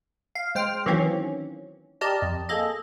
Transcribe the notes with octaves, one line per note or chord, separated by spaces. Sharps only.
F5
G#3 C5 G5 F6
D#3 E3 F#3 A#3 C4 C#4
G4 A#4 D5 D#5 A5
F2
A#3 G#4 A4 D#5